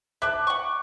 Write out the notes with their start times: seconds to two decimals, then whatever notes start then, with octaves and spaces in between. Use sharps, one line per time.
0.22 E5 A5 D6 F#6
0.47 F#5 C#6